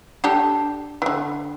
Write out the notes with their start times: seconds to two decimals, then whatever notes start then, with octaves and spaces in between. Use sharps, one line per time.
0.24 D4 G4 A4
1.02 D3 E3